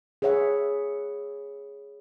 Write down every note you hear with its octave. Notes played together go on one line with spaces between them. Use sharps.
G#4 B4 C#5 E5 F#5